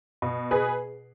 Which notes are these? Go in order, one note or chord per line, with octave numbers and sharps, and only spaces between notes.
B2
G#4 B4